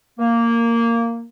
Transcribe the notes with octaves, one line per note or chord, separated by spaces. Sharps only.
A#3